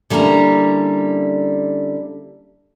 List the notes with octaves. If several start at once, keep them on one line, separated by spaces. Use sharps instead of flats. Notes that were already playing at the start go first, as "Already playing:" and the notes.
D3 G3 A#3 C#4 E4 A#5